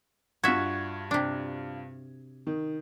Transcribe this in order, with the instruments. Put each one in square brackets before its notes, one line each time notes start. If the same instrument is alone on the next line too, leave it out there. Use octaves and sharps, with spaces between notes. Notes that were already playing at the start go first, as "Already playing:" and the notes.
[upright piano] G2 F4 G#6 [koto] F#4 E5
[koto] C3 D4
[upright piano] D#3